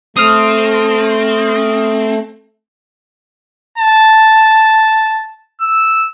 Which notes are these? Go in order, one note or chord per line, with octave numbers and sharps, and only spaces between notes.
A3 C4 D#6 F6
A5
E6